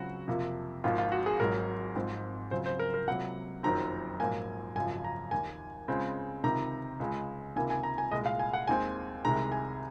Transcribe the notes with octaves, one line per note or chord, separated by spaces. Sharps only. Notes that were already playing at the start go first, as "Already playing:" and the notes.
Already playing: C#2 C#3 F#3 C4 F#4
F2 C3 F3 A#3
G#1 G#2 F3 A#3 F4
F4
F#4
G#4
G#1 G#2 F#3 A#4
G#1 G#2 F3 C4
C#2 C#3 F#3 C4 C5
C5
A#4
A#4
C#2 C3 F#3 A#3 F#5
F#1 F2 D#3 F#3 C4 A#5
A#1 G#2 F#3 A#3 G#5
G#1 F#2 C#3 F3 G#5
A#5
D#2 D#3 A#3 G#5
C#2 C#3 G#3 C4
C#2 C3 D#3 A#5
C#2 C#3 G#3
C#2 C3 D#3 A#3 G#5
G#5
A#5
G#5
C2 A#2 G#3 D#5
F5
G#5
F#5
D#2 D#3 G#3 C4 G#5
C2 C3 D#3 G#3 A#5
G#5